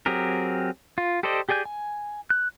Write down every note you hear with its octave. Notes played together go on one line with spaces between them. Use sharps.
F#3 C4 G4 G#4 A#4
F4
G4 A4 C5 D5 D#5
G4 G#4 D5 G#5 G6
G#5
F#6